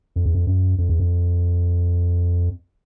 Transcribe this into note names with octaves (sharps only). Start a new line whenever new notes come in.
F2
E2
F2
F#2
F2
E2
F2